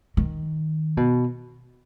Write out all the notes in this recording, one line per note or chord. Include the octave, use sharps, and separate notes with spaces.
D#3
B2